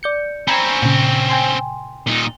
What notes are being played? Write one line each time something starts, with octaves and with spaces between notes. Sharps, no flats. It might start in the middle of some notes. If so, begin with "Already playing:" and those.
D5 G6 C#7
C4 C#4 G#5 A#5 B5
A#2 C#3
G5 G#5 C6
A#2 D#4